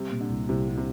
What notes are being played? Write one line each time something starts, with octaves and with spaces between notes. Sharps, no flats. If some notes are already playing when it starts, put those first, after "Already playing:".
Already playing: C3 G3
A#2
D3
C2
C2 C3
G3
C3